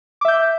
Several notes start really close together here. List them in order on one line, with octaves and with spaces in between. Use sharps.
D6 E5 G6